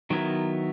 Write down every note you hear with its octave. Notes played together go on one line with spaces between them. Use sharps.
D#3 F#3 B3 E4 A#4